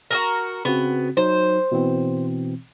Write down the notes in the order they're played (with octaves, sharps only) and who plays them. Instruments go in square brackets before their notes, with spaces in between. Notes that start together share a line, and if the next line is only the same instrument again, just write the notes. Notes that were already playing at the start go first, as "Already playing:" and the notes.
[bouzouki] F#4 G#4 A#4
[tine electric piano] C#3 C4 F#4 [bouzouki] B3
[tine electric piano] F#3 D#4 [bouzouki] C5
[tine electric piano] B2 E3 C4